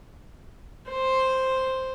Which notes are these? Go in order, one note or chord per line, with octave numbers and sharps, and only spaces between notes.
C5